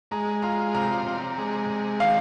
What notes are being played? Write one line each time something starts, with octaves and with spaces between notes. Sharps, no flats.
G#3 A#5
F4 A#5
C3 A#5
C3
G#3
C3
D#3 F5